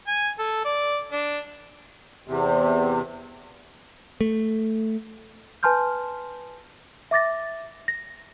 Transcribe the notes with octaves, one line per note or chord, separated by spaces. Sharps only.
G#5
A4
D5
D4
E2 C3
A3
B4 G#5 A5 C6 F6 G6
E5 D6 A6 A#6
A#6